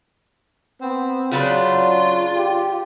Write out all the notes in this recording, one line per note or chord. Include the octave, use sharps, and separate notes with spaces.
B3 C4
C#3 F#3 D4 F4 B4
G4